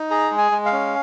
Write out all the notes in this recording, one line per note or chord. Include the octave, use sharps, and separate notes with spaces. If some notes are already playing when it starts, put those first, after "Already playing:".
Already playing: D#4
G#4 A#5
G#3
G#5
G#3
F5
C#4